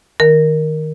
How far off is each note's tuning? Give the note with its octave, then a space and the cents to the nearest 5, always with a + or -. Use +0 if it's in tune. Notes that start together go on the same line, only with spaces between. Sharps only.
D#3 +0 A#4 +5